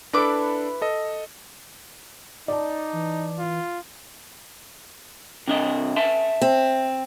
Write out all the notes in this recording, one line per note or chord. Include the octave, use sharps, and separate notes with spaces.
D4 E4 A4 B4 D6
A4 D#5
D#4 D5 A5
E3
F4
C3 D4 D#5
E5 A5 C6
C4